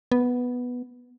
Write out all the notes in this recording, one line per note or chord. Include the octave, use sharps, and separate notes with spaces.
B3